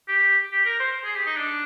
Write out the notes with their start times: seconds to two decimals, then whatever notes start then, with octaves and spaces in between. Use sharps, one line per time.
0.08 G4
0.51 G4
0.65 A#4
0.80 C5
1.04 G#4
1.15 G4
1.26 D#4
1.36 D4